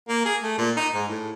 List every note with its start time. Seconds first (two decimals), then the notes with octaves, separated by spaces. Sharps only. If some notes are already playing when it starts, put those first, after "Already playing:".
0.08 A#3
0.25 G#4
0.43 A3
0.58 A#2
0.76 D#4
0.94 G#2
1.08 A2